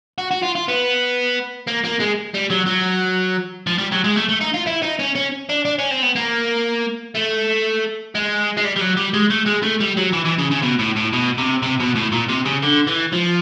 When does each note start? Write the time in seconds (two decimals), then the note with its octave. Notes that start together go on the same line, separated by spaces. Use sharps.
0.18 F#4
0.31 F#4
0.43 F4
0.55 F4
0.68 B3
1.68 A#3
1.85 A#3
2.00 G#3
2.34 G3
2.51 F#3
2.67 F#3
3.67 F3
3.78 G3
3.92 F#3
4.04 G#3
4.16 A3
4.29 A3
4.41 D#4
4.54 F4
4.67 E4
4.82 D#4
4.99 C#4
5.16 C#4
5.49 D4
5.65 D4
5.79 C#4
5.91 C4
6.02 B3
6.16 A#3
7.15 A3
8.15 G#3
8.57 G#3
8.64 G3
8.76 G3
8.81 F#3
8.97 G3
9.14 G#3
9.30 A3
9.46 G#3
9.63 A3
9.80 G3
9.97 F#3
10.13 E3
10.25 E3
10.39 C#3
10.51 C#3
10.63 B2
10.79 A2
10.96 A2
11.13 B2
11.38 C3
11.63 C3
11.80 B2
11.96 A2
12.12 A#2
12.29 C3
12.46 C#3
12.63 D3
12.87 E3
13.13 F3